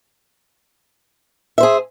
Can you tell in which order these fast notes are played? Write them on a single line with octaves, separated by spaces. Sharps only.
E5 C5 G#4